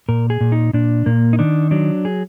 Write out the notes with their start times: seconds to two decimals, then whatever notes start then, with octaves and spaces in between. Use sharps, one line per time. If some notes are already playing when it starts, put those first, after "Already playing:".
0.09 A#2 A#4
0.30 G#4
0.41 A#2
0.52 D#4
0.73 A#2 D4
1.06 A#2 A#3
1.33 D#4
1.39 D#3 D4
1.71 F#3 D4
2.05 G#4